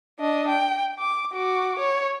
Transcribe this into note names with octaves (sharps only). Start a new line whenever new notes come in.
D4 D#5
G5
D6
F#4 D6
C#5